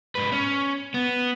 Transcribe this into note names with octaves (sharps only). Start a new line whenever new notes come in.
G#2 B4
C#4
B3